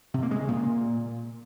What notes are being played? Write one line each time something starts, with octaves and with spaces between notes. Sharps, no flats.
C3
A#3
G#3
C#3
A#2